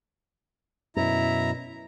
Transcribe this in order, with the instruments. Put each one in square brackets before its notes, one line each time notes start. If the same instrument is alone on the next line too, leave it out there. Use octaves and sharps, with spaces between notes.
[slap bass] F#2 B2 [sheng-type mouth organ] E4 A#5